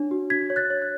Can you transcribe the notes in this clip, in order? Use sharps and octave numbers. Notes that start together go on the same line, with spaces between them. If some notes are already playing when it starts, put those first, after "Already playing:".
Already playing: D4 C#5
F#4
D4 G#6 B6
C#5
F#6 A6
C#5
F#6